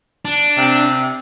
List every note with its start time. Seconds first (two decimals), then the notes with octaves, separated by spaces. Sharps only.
0.25 D4
0.57 C3